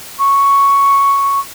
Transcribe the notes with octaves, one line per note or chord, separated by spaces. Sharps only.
C#6